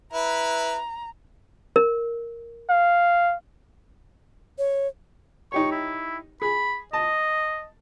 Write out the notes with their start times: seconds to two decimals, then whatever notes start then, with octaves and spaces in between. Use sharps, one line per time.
0.13 E4 B4 A#5
1.76 A#4
2.69 F5
4.58 C#5
5.52 D#4 G4 C#5 C#6
5.71 E4
6.42 G#4 B5
6.93 D#5 A5